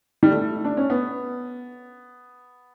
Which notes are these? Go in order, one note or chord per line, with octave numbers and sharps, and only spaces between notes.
G3
A3
D4
C#4
B3